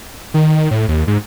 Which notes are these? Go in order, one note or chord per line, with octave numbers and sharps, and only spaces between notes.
D#3
A2
D#2
G#2